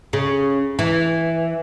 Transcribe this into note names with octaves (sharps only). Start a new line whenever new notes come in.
C#3
E3